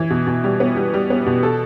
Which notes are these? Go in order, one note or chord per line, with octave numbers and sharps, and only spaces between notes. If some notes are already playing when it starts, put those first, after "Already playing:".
Already playing: E3
B2
B2
G3
B3
G3
G3
B3
B2
A4